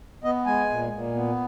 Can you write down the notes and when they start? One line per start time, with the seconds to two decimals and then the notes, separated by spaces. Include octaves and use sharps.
0.24 B3 D#5
0.46 G#3 G#5
0.70 A#2
0.93 A#2
1.15 B3